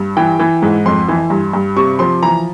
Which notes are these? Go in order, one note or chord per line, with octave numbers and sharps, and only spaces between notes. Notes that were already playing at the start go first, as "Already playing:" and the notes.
Already playing: G2
E3 G5
E3
G#2
F2 C6
E3
G2
G2
C3 C#6
F3 C6
E3 A#5